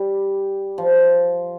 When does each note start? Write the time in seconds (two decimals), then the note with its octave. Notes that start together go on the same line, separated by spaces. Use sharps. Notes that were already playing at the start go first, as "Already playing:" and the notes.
Already playing: G3
0.78 F3